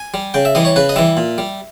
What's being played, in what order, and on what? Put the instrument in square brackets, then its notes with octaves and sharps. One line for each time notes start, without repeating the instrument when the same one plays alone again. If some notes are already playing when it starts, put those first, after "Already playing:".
Already playing: [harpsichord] G#5
G3
C#3 G5
E5
E3 G3 D#5
C#5
C#3 B4
D#5
E3 G3 E5
A#2
G3